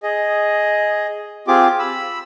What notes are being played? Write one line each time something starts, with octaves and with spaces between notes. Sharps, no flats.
G#4 D#5
C4 F4 G4 G#4 D6
B5 E6